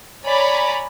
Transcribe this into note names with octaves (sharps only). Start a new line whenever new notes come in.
C#5 D5 G#5 A#5 B5